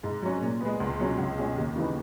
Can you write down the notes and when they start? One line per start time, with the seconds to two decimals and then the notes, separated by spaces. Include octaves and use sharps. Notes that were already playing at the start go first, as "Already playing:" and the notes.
0.03 G#2
0.22 F#3 C#4
0.41 A#2
0.61 G#3 B3
0.80 C#2
0.99 B2 F#3 C#4
1.18 C#2
1.38 B2 G#3 C#4
1.57 D#2
1.76 C#3 E3 B3 D#4